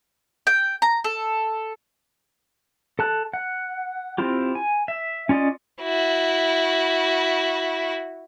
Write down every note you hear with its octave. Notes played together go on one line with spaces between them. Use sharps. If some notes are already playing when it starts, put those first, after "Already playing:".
G5
A#5
A4
A4 A5 F#6
F#5
C4 E4 F4 G4
G#5
E5
C#4 F4 D5 D#5
E4 F#4